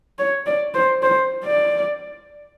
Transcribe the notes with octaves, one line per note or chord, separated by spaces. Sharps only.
C#5
D5
C5
C5
D5